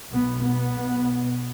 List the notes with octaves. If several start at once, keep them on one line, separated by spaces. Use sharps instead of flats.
B1 B2 B3
B3
B1 B2